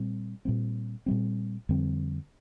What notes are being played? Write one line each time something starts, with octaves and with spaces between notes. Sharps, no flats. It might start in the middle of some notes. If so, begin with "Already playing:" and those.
Already playing: A#2 G3 C4
A#2 G3 C4
A#2 G3 C4
F2 D3 G3 C4